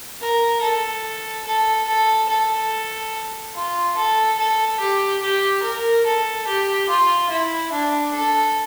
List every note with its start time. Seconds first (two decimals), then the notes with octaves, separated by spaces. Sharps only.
0.21 A#4
0.62 A4
1.46 A4
1.88 A4
2.29 A4
3.55 F4
3.96 A4
4.39 A4
4.80 G4
5.22 G4
5.63 A#4
6.05 A4
6.47 G4
6.89 F4
7.30 E4
7.73 D4
8.14 A4